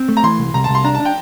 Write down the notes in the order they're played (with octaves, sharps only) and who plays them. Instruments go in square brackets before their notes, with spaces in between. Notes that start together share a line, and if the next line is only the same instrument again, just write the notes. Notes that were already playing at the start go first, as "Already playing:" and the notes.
Already playing: [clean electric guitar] C4
A3
[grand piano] A#5
[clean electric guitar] E3 [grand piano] C6
[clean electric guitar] C2
[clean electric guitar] C2 [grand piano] A#5
[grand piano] A5
[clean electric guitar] C2
[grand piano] C6
[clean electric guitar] D4 [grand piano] A#5
[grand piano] A5
[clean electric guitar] D4
[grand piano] G5